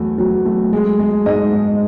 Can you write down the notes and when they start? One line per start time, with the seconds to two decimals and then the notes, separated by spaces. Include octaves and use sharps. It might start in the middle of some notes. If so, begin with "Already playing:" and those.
Already playing: E2 F#3 A3
0.18 F#3
0.46 A3
0.73 G#3
0.99 G#3
1.26 G#2 D#5
1.53 G#2